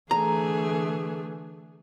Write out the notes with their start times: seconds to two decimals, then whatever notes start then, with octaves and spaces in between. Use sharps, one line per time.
0.11 D3 E3 A3 G#4 A#5